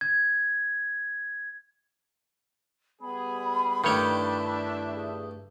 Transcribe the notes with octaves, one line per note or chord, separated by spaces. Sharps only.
G#6
G3 B3 G#4 B5
G2 D#3 A3 D4 E4 G4 C#5 E5
G#4